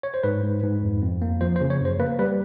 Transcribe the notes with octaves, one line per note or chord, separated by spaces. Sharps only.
C#5
C5
G#2 B4
G#2
G#2
F2
F2
A#3
F3 C5
C5
C#3
C#5
F#2 C5
A#3 B4
G3 B4